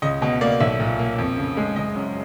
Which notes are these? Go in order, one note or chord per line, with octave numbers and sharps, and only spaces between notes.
C#2 D#5
B2 D#5
A#3 D5
B1 E5
A#2
A#3
F2
C#3
G#3
F#1 D#5
F#2